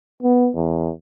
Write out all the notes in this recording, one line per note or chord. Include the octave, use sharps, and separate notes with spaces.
B3
E2